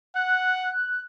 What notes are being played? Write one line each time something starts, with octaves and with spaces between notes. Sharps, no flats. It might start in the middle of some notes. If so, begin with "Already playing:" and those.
F#5 F#6